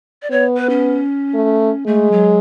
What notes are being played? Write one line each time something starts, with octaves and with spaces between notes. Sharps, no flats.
D5
B3 C#5
B4
C#4
A3
G#3 A3
F#3